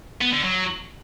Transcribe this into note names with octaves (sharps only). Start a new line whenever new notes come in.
B3
D3
F#3